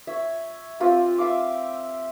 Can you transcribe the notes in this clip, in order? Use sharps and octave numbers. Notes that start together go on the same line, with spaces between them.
C#5 E5
C4 F4 G4
E5 F5 D6